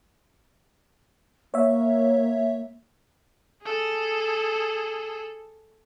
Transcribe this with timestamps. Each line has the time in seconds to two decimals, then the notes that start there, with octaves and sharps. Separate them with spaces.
1.54 A#3 C#5 E5
3.63 G#4 A4